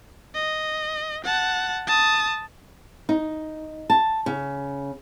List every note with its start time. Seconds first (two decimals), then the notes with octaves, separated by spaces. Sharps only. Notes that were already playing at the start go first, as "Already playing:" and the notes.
0.35 D#5
1.25 F#5 A5
1.87 A5 D#6
3.09 D#4
3.90 A5
4.26 C#3